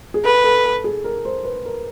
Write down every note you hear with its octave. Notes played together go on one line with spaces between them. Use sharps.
G#4
A4 B4
A4
A4
G#4
A#4
C5
B4
A#4